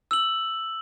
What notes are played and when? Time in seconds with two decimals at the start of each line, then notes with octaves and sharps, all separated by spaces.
0.11 E6 F#7